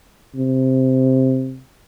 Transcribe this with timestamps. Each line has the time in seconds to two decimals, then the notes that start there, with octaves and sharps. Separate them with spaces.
0.35 C3